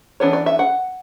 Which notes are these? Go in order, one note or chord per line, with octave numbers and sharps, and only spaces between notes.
E3 B3 D4 C#5
D5
E5
F#5